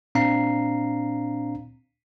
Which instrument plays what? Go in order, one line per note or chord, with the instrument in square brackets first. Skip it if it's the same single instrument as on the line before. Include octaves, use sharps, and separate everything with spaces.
[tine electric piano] A#2 C4 D4 F5 A#5 C7